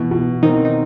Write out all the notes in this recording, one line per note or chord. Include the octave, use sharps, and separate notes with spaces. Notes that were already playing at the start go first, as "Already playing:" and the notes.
Already playing: B2 E3 E4
B2
D#3 C4 D#4
D#4